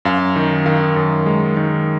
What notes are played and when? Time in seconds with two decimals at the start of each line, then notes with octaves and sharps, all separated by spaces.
0.05 F#2 F5
0.36 D#3
0.66 D#3 F5
0.96 F#2
1.26 G#3
1.56 D#3